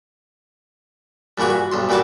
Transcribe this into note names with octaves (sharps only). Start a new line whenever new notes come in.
G2 A#2 E3 F#4 G#4
F#4
B1 G2 C6
A#2 E3 G3 F#4 A5